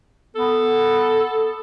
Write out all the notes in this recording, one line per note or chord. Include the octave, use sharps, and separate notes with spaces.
B3 A4